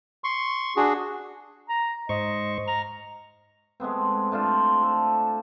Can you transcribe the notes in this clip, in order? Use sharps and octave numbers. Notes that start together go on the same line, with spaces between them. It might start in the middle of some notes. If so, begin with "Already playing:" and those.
C6 C#6
D4 F#4 G#4
A#5
G#2 C5 D#5 C#6
A#5 F6
G#3 A3 B3 C4
A3 D4 F4 C5
A4